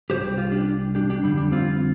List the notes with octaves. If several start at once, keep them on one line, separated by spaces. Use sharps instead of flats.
C2 C3 G3 G4 C5
G4
F4
D4 G4
D4 G4
D4 G4
F2 D3 G3 D4
D4
C4 F4